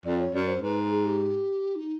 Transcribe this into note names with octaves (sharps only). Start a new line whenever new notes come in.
F2 D5
C#5
F#2 D5
C5
G#2 B4
G#4
G4
D#4